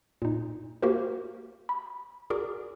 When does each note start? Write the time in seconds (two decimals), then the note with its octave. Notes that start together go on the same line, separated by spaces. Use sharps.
0.22 A#2 D#4
0.82 A#3 F#4 G4 A#4 C5
1.69 B5
2.30 F#4 G#4 A#4 D5 D6